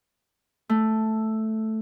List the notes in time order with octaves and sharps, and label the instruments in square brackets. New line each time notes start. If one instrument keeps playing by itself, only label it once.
[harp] A3